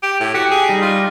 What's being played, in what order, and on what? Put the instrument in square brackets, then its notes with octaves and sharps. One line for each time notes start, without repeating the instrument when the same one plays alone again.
[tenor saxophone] G4
A2
[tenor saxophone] F#4 [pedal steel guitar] G4
[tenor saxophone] G#4
[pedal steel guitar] G3 D#4
[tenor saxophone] F4